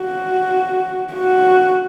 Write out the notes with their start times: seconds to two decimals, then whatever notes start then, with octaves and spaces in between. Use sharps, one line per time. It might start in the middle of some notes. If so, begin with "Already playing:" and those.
Already playing: F#4
1.13 F#4